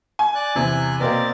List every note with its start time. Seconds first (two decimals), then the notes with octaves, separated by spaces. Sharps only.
0.19 G#5
0.35 D5 F#6
0.55 E2 C3 G#5 F#6
1.00 B2 A#3 C4 A#4 D5